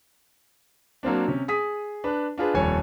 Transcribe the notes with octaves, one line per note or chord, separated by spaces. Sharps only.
F#3 A#3 C4 D4
C3 C#4
G#4 D#6 B6
D4 B4
D4 F4 G#4 B4
D#1 F2 G3 A4 C#5 G#5